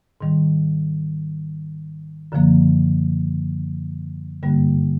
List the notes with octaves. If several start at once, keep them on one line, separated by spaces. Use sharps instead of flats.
G#2 D#3 G3
F#2 D3 F3 A#3
G2 D3 G3 A#3